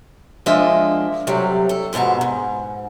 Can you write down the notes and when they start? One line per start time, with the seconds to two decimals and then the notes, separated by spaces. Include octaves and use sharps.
0.46 F3 G#3 A#3 D4 D#5 E5
1.27 A2 C3 F#3 G3 A3
1.69 A4
1.93 F2 G#2 B2 A5 A#5
2.21 G#2